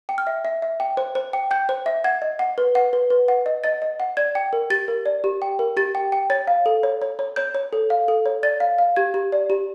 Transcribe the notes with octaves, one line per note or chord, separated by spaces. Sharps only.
G5
F6
E5
E5
E5
G5
C5
C5
G5
G5 G6
C5
E5
F#5 G#6
D#5
F#5
B4
F#5
B4
B4
F#5
D#5
D#5 A6
D#5
F#5
D5 G#6
G5
A#4
G4 A6
A#4
D5
G4
G5
A#4
G4 A6
G5
G5
C#5 A6
F5
A4
C#5
C#5
C#5
C#5 G6
C#5
A4
F5
A4
C#5
D5 A6
F5
F5
G4 G#6
G4
D5
G4